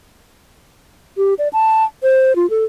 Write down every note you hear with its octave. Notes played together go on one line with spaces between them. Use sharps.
G4
D5
A5
C5
F4
A4